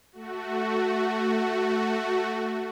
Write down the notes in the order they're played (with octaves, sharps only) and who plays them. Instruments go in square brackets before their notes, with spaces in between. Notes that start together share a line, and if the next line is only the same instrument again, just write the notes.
[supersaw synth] A3 F#4